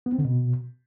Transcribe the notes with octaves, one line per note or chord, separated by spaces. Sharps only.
B3
C4
D3
B2